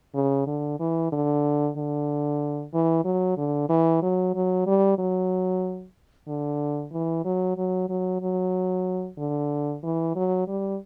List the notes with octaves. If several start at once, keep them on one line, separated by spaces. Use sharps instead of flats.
C#3
D3
E3
D3
D3
E3
F#3
D3
E3
F#3
F#3
G3
F#3
D3
E3
F#3
F#3
F#3
F#3
D3
E3
F#3
G3